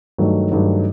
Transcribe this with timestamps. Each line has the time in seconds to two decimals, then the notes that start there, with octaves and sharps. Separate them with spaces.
0.18 G2 D#3 F#3 A3
0.51 G2 D#3 F#3 A3